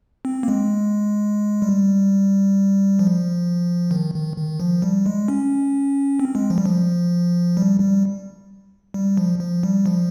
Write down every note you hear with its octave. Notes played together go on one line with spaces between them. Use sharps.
C4
A#3
G#3
G3
F3
D#3
D#3
D#3
F3
G3
G#3
C#4
C4
G#3
F3
G3
F3
G3
G3
G3
F3
F3
G3
F3